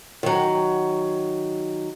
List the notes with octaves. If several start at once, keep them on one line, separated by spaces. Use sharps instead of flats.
D#3 F#3